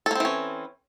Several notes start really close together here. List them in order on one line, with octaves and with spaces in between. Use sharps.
A4 A#3 C4 E3 C#4